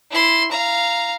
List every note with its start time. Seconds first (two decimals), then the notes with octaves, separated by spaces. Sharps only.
0.11 E4 C6
0.51 F5 A#5